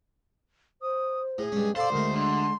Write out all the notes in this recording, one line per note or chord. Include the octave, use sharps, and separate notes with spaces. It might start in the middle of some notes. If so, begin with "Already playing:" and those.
C5 D#6
A2 G#4
G2 G#3 C#4
A4 C5 D5 F5 A5
D2 G#3 A3 A#4
D3 C6